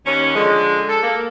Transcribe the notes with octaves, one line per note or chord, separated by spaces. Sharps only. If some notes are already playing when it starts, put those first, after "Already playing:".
D#2 C#4
D3 F3 G#3
A4
A#3